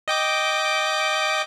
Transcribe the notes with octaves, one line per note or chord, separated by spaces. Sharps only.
D#5 G5 D6